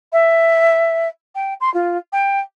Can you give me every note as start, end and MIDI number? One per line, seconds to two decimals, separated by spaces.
0.13 1.08 76
1.35 1.54 79
1.61 1.72 84
1.74 1.98 65
2.12 2.40 79